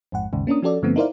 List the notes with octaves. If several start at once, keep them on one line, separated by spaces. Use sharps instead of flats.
A1 F2 G#2 F#5
A1 D#2 G#2 C#3
A#3 C#4 D4 A#4 D#6
F3 C#4 F#4 A4 D5
G2 D3 F3 A3 B3 C4
D#4 E4 A#4 C5 D5 F5